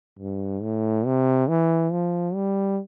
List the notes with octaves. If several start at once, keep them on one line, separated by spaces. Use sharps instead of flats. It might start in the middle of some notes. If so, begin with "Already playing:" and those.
G2
A2
C3
E3
F3
G3